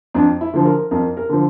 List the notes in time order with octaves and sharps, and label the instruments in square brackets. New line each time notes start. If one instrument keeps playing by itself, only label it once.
[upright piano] F2 D4
E4
D3 F3
A#4
F2 A#4
A#4
D3 F3